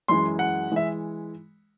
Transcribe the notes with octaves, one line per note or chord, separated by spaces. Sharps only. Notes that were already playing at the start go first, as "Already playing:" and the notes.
F#2 E3 G#3 C6
F#5
E3 G#3 E5